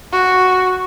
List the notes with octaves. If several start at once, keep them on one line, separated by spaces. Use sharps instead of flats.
F#4